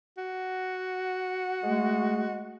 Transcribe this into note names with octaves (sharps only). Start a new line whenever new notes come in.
F#4
G#3 A3